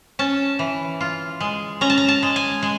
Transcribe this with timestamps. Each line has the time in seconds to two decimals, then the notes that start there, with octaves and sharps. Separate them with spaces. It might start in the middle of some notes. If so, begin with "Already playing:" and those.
0.19 C#4 A5
0.59 E3
1.01 F4
1.41 G#3
1.81 C#4 A#5
1.90 A5
1.98 A#5
2.08 A5
2.23 G#3
2.36 G#5
2.63 G#3